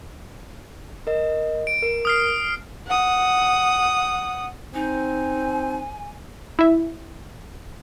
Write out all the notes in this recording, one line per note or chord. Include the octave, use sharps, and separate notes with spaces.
A#4 D#5
D7
A#4
D#6 F6 C7
F#5 D#6
C4 D#4 G#5
E4 E5